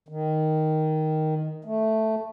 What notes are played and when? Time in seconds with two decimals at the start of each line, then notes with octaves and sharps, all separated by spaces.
0.09 D#3
1.65 A3